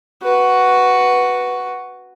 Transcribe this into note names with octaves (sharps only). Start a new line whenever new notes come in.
F#4 B4